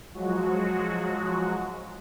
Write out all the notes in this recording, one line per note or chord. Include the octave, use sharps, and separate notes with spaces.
F3 F#3 G#3 F#4